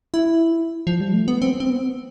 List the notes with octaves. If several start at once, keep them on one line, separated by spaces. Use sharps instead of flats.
E4
F3
G3
A3
B3
C4
C4
B3